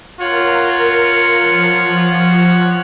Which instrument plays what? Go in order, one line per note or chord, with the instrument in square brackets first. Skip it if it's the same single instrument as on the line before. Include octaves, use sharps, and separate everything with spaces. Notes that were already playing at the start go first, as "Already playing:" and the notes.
[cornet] F4 [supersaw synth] A#4 [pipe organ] C#5 F#5
[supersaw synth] F3